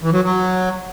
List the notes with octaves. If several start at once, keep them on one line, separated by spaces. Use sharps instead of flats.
E3
F#3
F#3